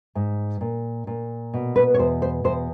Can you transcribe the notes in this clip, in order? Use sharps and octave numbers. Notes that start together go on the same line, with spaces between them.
G#2
A#2
A#2
B2
B4
C#5
E2 C5
C5
E2 C5